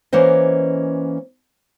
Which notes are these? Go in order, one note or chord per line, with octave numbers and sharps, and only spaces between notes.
E3 A#3 C#4 C5 D#5